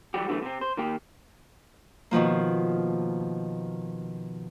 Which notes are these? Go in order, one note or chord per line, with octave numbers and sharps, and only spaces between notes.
E3 F#3 G3 F#4 G4
D3 E3 F#3 A3 B3
C3 C4
C5
D#3 A#3 G4
B2 D#3 F3 A#3